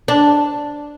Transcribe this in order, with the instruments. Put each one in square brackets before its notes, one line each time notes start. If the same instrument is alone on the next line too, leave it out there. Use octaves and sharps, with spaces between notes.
[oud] D4